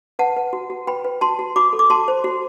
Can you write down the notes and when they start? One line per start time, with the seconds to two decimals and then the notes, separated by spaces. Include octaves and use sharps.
0.19 B4 F#5 A5
0.37 B4
0.53 F#4
0.70 F#4
0.87 B4 G5 B5
1.04 B4
1.21 F#4 A5 C6
1.39 F#4
1.56 F#4 B5 D6
1.73 A4
1.79 D6
1.90 F#4 A5 C6
2.08 C5
2.24 F#4